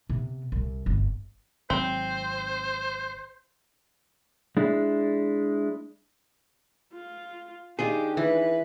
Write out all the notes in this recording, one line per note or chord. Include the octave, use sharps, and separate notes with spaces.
C3 B3
C2
G1 C3
G#1 F#3 C4 C5
G#3 D4 E4
F4
D#3 D4 D#4 F4 G4 G#4
E3 B4